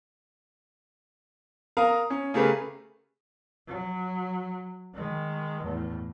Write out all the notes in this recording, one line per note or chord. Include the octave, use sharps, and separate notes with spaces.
A#4 F5 A#5 D#6
C#4
C#3 A3 G4 G#4 A#4 B4
F#3
D#3 G#3
E2 A2